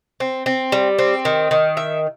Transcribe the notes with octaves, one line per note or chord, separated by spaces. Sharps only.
C4
C4
G3
C4
D#3
D#3
E5